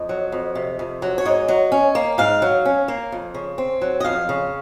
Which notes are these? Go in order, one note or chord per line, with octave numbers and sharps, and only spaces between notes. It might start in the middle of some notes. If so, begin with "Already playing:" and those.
Already playing: F2 D#5
F#3
F2
C3
F2
F#3
C#5
G#2 D#5
F#3
C#4
A#3
G#2 F5
F#3
C#4
A#3
F2
C#3
C4
F#3
D#5
F2 F5
C#3